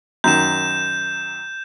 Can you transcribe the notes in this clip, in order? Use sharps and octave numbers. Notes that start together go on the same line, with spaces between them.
F#2 D#3 G6 E7